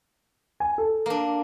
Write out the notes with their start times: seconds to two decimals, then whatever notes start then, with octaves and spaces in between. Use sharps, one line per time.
0.60 G#5
0.78 A4
1.06 A#3 D4